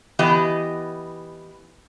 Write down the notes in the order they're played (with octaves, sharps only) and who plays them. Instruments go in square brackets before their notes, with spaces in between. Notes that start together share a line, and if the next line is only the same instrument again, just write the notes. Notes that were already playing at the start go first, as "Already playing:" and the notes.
[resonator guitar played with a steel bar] E3 B3 G4 D#5